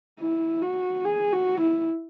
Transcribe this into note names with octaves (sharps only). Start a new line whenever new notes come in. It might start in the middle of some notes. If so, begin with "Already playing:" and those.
E4
F#4
G#4
F#4
E4